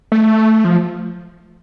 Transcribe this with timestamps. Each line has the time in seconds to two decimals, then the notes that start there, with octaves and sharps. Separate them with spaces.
0.12 A3
0.65 F3